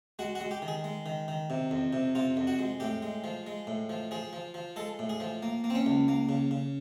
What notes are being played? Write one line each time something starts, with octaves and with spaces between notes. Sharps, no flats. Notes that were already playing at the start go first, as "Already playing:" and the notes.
G#3 F#4
F#4
G#3
G4
D#3
G#4
G#3
D#3
D#3
C3
F2
C3
C3 F4
F2
F#4
G#3
A2 G4
G#3
F3
G#3
A2
F3
F3 G#4
F3
F3
G#3 A4
A2
G#4
F3
A#3
A#3
C4
C#4
C#2
A#3
C#3
C#3